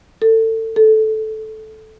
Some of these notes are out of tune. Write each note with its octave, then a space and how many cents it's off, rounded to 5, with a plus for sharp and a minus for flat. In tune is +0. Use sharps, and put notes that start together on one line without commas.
A4 +30
A4 -10